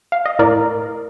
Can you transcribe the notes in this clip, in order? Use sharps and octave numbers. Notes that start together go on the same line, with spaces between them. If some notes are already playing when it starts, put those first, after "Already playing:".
F5
D#5
A2 A#4 D5